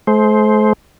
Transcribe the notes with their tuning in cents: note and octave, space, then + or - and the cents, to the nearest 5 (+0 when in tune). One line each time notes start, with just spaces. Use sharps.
A3 -45 C5 +0